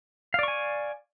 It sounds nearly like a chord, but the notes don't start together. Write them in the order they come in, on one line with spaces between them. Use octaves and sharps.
F5 D5 C#6 G#5